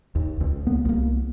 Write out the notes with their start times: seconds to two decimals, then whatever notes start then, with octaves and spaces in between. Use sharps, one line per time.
0.15 D#2
0.41 C#2
0.67 A#3 B3
0.85 C2 A#3